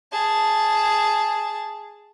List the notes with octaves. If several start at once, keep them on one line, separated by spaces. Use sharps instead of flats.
G#4 A5